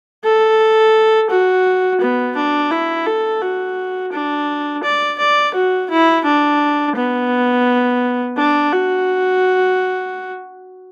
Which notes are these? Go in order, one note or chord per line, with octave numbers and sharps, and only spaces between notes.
A4
F#4
B3
D4
E4
A4
F#4
D4
D5
D5
F#4
E4
D4
B3
D4
F#4